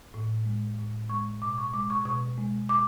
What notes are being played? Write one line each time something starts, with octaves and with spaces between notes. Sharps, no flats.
A2
G#3
A2
G#3 C#6
B2 D6
C#6
G#3 D6
C#6
B2 C#6
G#3
D6